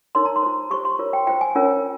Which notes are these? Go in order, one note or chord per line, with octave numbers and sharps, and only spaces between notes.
D#4 A#4 C#5 C6
A#5
C6
F4 C5
G4 C5 C#6
C6
F4 A#4 C#5
G5
F4 C5 G5
G#5
C#4 F4 A#4 C#5